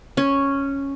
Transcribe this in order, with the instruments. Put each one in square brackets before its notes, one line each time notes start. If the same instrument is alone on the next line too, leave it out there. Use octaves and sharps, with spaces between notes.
[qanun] C#4